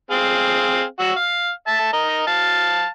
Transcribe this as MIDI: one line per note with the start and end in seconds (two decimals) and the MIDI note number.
0.11 0.82 60
0.11 0.82 68
0.11 0.82 77
0.99 1.12 66
0.99 1.12 88
1.16 1.50 77
1.67 1.90 76
1.67 1.90 81
1.93 2.26 70
1.93 2.26 75
2.27 2.87 77
2.27 2.87 81